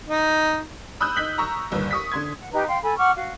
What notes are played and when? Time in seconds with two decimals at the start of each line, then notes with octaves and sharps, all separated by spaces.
0.09 D#4
1.00 B5 D#6 E6 F#6 G6
1.16 D#4 G6 B6 F#7
1.38 A#5 C#6 E6
1.72 G1 D#2 B4
1.91 C#6 D#6 B6
2.12 D3 C6 G#6
2.39 F#5
2.53 D#4 G4 B4 A#5
2.67 F5 G5 C6
2.82 A4 G#5 B5
2.97 F#5 C#6 D6 F6
3.16 F#4 F5